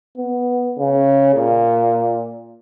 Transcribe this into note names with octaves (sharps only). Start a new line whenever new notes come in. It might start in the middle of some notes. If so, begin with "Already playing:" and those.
B3
C#3
A#2